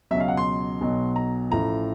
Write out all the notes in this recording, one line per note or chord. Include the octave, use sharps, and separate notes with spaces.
C#2 B2 F#3 E5
F5
F#5
C6
B1 B2 F#3
A#5
A1 A2 F3 A#5